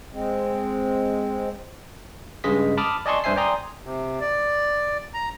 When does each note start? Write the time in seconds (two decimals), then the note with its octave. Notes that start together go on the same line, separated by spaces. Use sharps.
0.13 G#3 C4
2.44 G2 C#3 G#3 D#5 B6
2.77 A5 B5 D6 D#6 F6
3.06 D5 D#5 G#5 A5 C6 C#6
3.24 G2 D4 C5 E5 G#5 C7
3.36 D5 G5 G#5 A#5 C6 D#6
3.84 C3
4.21 D5
5.14 A#5